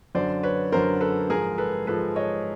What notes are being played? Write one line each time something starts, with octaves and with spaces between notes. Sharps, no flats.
F#2 D3 F#3 C5 D5
B4 C#5
F#2 D3 F#3 A#4 C5
A4 B4
G#2 F3 G#3 G#4 A#4
A4 B4
G#2 F3 G#3 A4 B4
C#5 D#5